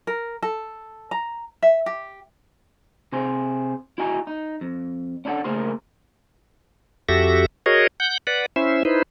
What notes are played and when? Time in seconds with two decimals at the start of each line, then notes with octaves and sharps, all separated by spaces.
0.07 A#4
0.43 A4
1.11 A#5
1.62 E5
1.86 G4
3.12 C3 G#4 C5
3.98 E4 F#4 D#5 G#5 A#5
4.27 D#4
4.61 F2
5.25 C#4 D4 E4 A4 F#5
5.44 C#3 A3 A#3 G#4 A#4 C5
7.09 F2 F#4 G4 A4 E5 A#6
7.66 F#4 G#4 A#4 C#5 D#5
8.00 F#5 G6
8.27 B4 D5 F#5
8.56 C#4 E4 C5 E5
8.85 D#4 E4 B4 C5